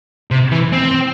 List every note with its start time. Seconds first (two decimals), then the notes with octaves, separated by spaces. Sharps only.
0.31 C3
0.51 E3
0.73 C4